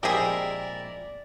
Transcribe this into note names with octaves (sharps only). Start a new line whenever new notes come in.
A#1 G#3 C4 E4 G4 G#4 A#4 D5